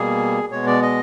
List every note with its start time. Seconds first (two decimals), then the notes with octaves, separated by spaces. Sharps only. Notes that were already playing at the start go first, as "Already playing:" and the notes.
Already playing: B2 G3 A#3 G#4
0.52 B2 G#3 B3 C#5
0.67 D5
0.82 D#5